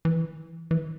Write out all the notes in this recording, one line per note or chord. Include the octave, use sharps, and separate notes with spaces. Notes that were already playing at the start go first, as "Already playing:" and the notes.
E3
E3